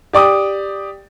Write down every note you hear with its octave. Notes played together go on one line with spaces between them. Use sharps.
G4 D5 D6 D#6